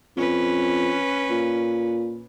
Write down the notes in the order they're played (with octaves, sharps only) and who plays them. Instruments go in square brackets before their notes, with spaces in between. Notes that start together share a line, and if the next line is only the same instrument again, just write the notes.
[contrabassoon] F2 [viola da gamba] C#4 B4
[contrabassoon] A#2